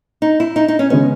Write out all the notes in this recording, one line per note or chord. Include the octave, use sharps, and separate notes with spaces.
D#4
E4
D#4
D#4
C#4
C#3 G#3 B3 C#4